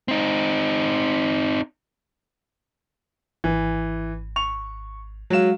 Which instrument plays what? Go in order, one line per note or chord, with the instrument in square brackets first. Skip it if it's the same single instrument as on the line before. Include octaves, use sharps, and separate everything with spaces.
[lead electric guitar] C4 D#4
[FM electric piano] G#1 [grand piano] E3
[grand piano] C#6 F7
[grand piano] F#3 E7 [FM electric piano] G#3 F#4 F5